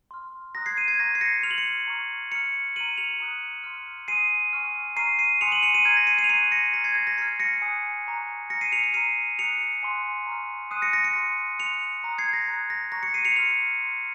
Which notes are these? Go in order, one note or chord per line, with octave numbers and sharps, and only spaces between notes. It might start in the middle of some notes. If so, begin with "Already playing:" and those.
C6 F6
A#5 D#6 F#6 A#6
G#6 C7
C7 D#7
G#6 C7
A#5 C#6 F#6 A#6
C7
A#6 C#7
C6 F6 F7
F#7
C#7 F7
A#5 C#6 F6
A#5 F6 C#7 F7
A#5 F6 D#7 F#7
C#7 F7
A#5 D#6 F#6
C6 F6
G#5 C6 D#6 C7 D#7
G#5 C#6 F6
A#5 C#6 F6 C7 D#7
C7 D#7
G#5 C6 D#6 F#6 C#7 F7
D#7 F#7
C#7 F7
C7 D#7
A#5 F6 G#6 C7
A#6
C7 D#7
C7 D#7
F7
A#5 C#6 F#6 C7 D#7
A#6 C#7
A#5 F6 A#6
G#6 C7
A#6
A#6
A#5 F6 G#6 C7
A#6 C#7
G#5 D#6 F#6
A#5 C#6 F#6
A#5 F6 A#6 C#7
C7 D#7
C#7 F7
C#7 F7
A#5 F6 C7 D#7
A#5 D#6 F#6 C#7 F7
G#5 C6 D#6 F#6
A#5 C#6 F6
G#5 C6 D#6 F#6 C7 D#7
A#6 C#7
A#6 C#7
A#6 C#7
C6 F6
C6 F#6 C#7 F7
A#5 D#6 F#6
G#6 C7
A#6
A#5 D#6 F#6
A#6
A#5 C#6 F#6 A#6
A#6 C#7
C7 D#7
C#7 F7
C6 F6 C#7 F7
C6 F6